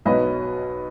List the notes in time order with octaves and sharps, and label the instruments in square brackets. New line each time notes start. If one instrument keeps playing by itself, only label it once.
[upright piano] B1 B2 F#3 B4 D#5